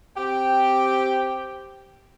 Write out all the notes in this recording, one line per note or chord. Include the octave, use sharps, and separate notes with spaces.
C4 G4 G5